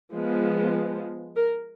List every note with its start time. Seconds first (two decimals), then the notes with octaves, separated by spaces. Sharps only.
0.13 F3 G#3 B3
1.36 A#4